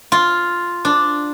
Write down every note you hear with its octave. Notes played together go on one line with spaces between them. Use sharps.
F4
D4